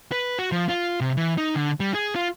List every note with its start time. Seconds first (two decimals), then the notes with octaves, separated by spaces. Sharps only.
0.12 B4
0.39 F#4
0.52 F3
0.69 F4
1.01 C3
1.17 E3
1.38 D#4
1.55 D3
1.80 G3
1.94 G#4
2.15 F4